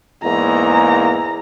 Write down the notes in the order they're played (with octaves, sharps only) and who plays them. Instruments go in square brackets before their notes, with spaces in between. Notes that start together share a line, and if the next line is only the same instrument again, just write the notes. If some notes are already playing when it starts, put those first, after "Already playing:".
[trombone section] E2 G#2 A#3 [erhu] A#5